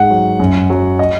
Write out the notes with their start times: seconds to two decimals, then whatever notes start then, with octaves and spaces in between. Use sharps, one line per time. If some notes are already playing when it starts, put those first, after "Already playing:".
Already playing: G#2 F#5
0.10 F#3
0.40 F#2
0.70 F#3
0.99 D#5